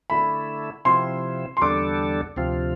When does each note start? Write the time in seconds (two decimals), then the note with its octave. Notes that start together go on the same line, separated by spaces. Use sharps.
0.10 D3 A3 E4 B5
0.85 C3 F3 C4 E4 C6
1.57 C6
1.61 E2 D3 G3 D4 A4 D6
2.36 D2 C3 F3 C4 F4